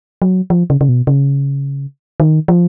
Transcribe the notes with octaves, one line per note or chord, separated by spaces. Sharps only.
F#3
F3
C#3
C#3
B2
C#3
D#3
F3